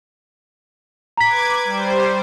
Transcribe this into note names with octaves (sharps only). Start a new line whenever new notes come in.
B4 A#5 D6 G#6 B6
G3 C5